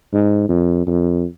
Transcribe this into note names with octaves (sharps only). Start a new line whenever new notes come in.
G#2
F2
F2